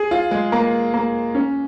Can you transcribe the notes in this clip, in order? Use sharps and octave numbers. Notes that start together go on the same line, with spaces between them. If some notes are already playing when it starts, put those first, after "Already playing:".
Already playing: G#4
F4
G#3
A#3
A#3
C#4